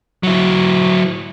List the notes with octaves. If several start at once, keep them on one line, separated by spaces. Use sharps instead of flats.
F#3 E4